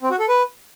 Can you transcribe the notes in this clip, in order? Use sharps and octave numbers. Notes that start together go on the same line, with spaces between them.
C4
F#4
A4
B4